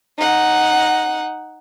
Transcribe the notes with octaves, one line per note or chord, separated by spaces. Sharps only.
D#4 F#5